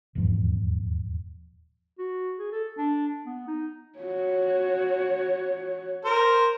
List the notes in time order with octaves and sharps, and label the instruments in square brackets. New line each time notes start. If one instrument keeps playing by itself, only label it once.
[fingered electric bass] D#1 E2 G#2 F3
[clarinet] F#4
G#4
A4
D4
B3
D#4
[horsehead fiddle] F#4 C#5
[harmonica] A#4 C5